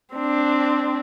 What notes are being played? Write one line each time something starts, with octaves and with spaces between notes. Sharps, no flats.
C4 D4